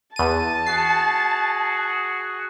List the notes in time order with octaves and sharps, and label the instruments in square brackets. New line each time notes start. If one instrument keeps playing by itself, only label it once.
[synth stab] E2 D#7 [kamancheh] A5
[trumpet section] F#4 G#4 [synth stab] C7